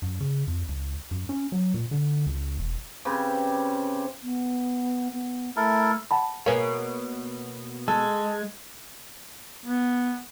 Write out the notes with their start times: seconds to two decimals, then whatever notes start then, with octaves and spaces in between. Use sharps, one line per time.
0.02 F#2
0.21 C#3
0.47 F2
0.69 C#2
1.11 F#2
1.29 C#4
1.52 F#3
1.74 A#2
1.91 D3
2.27 C#2
2.59 E1
3.05 C#3 C4 G4 B4
4.22 B3
5.12 B3
5.56 A3 E4 A4 A#4
6.11 F#5 A5 B5
6.46 B2 A#3 G#4 C#5 F5
7.88 G#3 A4
9.66 B3